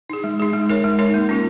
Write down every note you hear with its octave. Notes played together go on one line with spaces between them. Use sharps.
D#4 G#4
G#3
D#4 G#4
G#3
D#4 A#4 C#5
G#3
D#4 A#4 C#5
A#3
C#4 F4 A#4